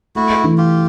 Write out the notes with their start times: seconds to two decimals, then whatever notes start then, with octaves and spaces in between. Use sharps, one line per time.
0.15 A3 E4 F#4
0.44 E3
0.58 F4 G4